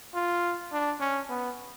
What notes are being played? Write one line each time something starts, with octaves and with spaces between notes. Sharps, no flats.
F4
D4
C#4
B3